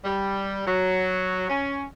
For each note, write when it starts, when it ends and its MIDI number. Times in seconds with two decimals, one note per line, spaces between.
0.05 0.62 55
0.66 1.46 54
1.50 1.84 61